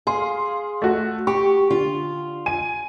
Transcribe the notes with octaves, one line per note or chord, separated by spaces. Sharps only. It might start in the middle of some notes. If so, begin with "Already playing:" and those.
G#4 F5 C6
A3 F#4
G4 C#6
D3 F4
G#5 D#7